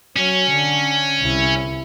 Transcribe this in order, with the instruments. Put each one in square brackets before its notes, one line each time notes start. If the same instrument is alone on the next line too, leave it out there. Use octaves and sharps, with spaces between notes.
[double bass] F#3 [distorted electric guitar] C#4
[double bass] D3
C2 E4